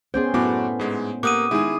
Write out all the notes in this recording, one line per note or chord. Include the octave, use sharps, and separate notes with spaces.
B3 C#4 G#4 C5 D5 G5
F#2 A2 A3 B3 F#4 B4 D6
G#2 G#3
A#3 G4 F#5 D6 D#6 D#7
D#3 G#3 E4 G#4